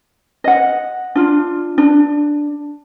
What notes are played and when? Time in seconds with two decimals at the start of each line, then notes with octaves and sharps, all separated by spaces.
0.44 D#5 F#5
1.15 D4 F4
1.78 D4